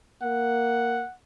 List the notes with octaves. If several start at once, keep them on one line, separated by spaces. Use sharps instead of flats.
A#3 F#5